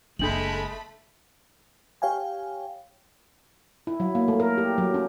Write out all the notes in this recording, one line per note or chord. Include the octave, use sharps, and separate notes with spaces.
F#1 G#3 A3 D4 B5 F#7
G4 C#5 F5 G5 G#5
E4
F#3
A#3
A3
A#4
G4
F#3
C#4